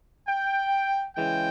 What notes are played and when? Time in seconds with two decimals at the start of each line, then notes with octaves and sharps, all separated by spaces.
0.27 G5
1.16 C#3 E3 G#3 G5